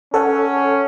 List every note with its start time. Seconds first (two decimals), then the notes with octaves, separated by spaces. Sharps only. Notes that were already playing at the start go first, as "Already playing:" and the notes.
0.14 C#4 A4 C#5 F#5